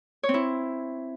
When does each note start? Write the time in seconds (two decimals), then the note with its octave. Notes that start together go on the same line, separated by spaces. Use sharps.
0.23 C#5
0.29 C4
0.34 E4